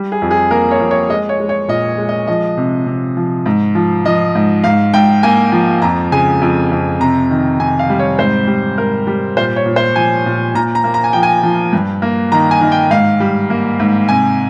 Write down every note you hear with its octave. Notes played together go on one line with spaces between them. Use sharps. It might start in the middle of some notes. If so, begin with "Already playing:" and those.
Already playing: G3
G#4
F2
G#4
A#3 A#4
C#5
F2
C#5
G#3 D#5
C#5
G#3
C#5
A#2 D#5
G#3
D#5
F3 D#5
C3
C3
F3
G#2
F3
F3 D#5
G#2
G#2 F5
G#2 G5
A#3 G#5
F3
F2 A#5
C#3 G#5
F2
F2
C3 A#5
D#3
C3 G#5
F5
G3
C#5
G#2 C5
G3
G#2 A#4
G3
A#2 C5
C#5
A#2
C5
F3 G#5
A#2
A#2 A#5
A#5
A#3
A#5
G#5
F3 G5
G#5
F3
G2
A#3
D#3 A#5
G#5
D#3
G5
G#2 F5
G3
A#3
G#2
C3 G#5